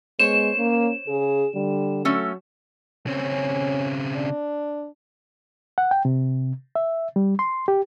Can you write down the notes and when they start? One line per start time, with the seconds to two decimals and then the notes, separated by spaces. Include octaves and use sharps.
0.19 G#3 B3 C5 C#5 E7
0.58 A#3 C#4
1.08 C#3 G#4
1.55 D3 G3
2.05 F#3 A3 C#4 A4
3.07 C#3 C4 C#4
4.16 D4
5.78 F#5
5.91 G5
6.05 C3
6.75 E5
7.16 G3
7.39 C6
7.68 G4